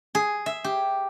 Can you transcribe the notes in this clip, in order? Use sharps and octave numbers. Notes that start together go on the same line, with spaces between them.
G#4
E5
G4